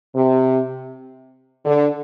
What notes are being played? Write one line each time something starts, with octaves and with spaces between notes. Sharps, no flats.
C3
D3